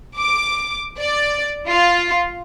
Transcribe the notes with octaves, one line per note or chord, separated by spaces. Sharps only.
D6
D5
F4